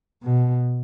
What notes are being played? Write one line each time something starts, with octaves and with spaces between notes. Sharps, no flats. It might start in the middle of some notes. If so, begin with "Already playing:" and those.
B2